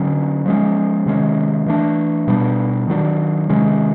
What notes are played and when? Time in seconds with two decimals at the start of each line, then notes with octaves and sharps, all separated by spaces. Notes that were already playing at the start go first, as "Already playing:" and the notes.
Already playing: D3 F#3 C#4
0.46 F3 G#3 C#4
1.06 C3 D#3 G#3 C#4
1.66 E3 A3 D4
2.28 B2 G3 B3 D4
2.88 D#3 F#3 A#3 D4
3.49 C3 D#3 G#3 C#4